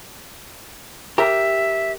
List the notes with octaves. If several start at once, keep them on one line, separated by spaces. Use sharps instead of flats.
G4 A#4 E5